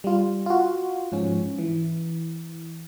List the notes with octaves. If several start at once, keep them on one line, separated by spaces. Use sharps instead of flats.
G3 F4
F4 F#4
G#2 F3 C#4
E3